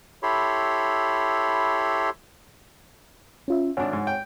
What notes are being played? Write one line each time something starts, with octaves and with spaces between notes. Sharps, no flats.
E4 G4 A4 C#5 B5 C6
C#4 F4 E5
G#1 D4 C#5 F#5 G#5
G#2
G5